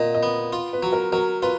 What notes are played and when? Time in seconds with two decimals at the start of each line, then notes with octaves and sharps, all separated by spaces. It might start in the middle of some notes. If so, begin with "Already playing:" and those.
Already playing: A#2 D#5
0.15 D#5
0.23 B3
0.53 F4
0.73 B4
0.83 F#3
0.93 A#4
1.13 F#3 A#4
1.43 F4 B4